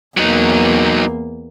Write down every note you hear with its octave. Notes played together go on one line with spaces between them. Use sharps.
E2 F#3 A#3 D#4